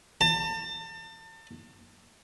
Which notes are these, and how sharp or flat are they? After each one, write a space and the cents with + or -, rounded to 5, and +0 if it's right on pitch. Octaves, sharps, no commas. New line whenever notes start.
A5 +35